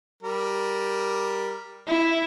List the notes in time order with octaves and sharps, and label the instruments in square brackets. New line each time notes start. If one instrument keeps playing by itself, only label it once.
[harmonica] G3 A#4
[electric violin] E4